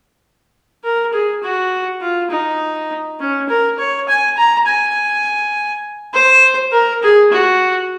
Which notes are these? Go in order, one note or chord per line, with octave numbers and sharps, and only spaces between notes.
A#4
G#4
F#4
F4
D#4
C#4
A#4
C#5
G#5
A#5
G#5
C5
A#4
G#4
F#4